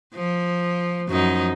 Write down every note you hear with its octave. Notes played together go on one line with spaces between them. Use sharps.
F3
F#2 F3 D#4